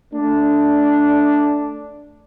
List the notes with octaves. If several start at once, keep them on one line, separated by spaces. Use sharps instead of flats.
A3 D4